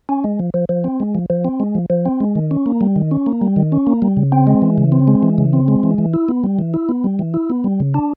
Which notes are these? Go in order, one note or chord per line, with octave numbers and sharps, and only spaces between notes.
C#4
G#3
F3
F3
F3
C4
G#3
F3
F3
C4
G#3
F3
F3
C4
G#3
D#3
C#4
A#3
G3
D#3
C#4
A#3
G3
D#3
C#4
A#3
G3
C#3
C4
G#3
E3
C#3
C4
G#3
E3
C#3
C4
G#3
E3
E3
E4
B3
G3
E3
E4
B3
G3
E3
E4
B3
G3
C#3
D4